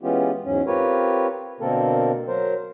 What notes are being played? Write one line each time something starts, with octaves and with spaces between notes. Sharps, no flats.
E3 G#3 B3 C#4 F4 G4
E2 G#2 F#3 C#4
C4 F4 G4 A#4 B4 C#5
B2 D3 A#3 C4 A4 A#4
F#3 A#4 C5